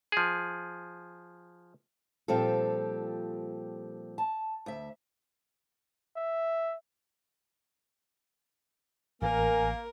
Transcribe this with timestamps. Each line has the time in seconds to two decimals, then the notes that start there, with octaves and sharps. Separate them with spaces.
0.12 F3 G#4
2.28 A#2 F3 G3 C4 G4 A4
4.18 A5
4.66 D2 E5
6.16 E5
9.22 A1 A#3 A#4 G#5